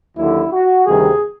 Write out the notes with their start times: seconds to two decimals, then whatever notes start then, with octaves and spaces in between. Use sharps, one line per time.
0.17 D#2 D3 F#3 E4
0.52 F#4
0.86 D2 C3 D#3 G3 G#4